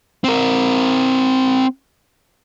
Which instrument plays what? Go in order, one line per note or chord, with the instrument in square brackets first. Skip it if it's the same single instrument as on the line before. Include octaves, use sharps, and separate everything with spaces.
[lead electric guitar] C4 A#4